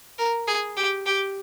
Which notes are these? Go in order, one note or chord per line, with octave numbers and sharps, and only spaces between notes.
A#4
G#4
G4
G4